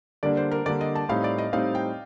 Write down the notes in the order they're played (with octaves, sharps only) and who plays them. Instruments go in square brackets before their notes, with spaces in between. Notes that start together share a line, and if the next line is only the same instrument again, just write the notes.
[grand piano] D3 G3 A#3 D4 [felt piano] D5
[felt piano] C5
A#4
[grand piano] D3 G3 A#3 D4 [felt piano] D5
[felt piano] D#5
A5
[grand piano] A2 G3 C4 D#4 [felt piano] F5
[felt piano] D5
D#5
[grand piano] A2 G3 C4 D#4 [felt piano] F5
[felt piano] G5